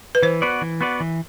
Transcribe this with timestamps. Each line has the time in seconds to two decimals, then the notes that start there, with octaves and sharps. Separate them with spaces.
0.15 B4
0.23 E3 C5
0.42 B3 F#4 B4 D5
0.62 E3
0.81 B3 F#4 B4 D5
1.00 E3